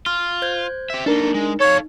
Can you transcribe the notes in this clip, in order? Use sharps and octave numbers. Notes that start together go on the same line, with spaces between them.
F4 F6
C5 G6 G#6
G4 E5
A#3 D4 D#4 A4 A#4
G#3
A4 C#5 F5